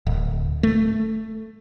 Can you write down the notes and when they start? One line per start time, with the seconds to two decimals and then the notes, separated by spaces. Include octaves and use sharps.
0.07 D1
0.63 A3